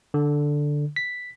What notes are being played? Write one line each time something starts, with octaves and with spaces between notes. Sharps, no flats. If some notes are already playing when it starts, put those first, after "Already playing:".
D3
B6